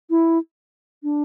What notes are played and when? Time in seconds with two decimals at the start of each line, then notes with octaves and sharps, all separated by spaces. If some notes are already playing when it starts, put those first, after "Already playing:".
0.10 E4
1.03 D4